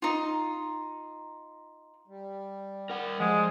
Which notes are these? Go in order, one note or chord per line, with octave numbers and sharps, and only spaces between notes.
D#4 F4
G3
A#4 F#5
F3 G#3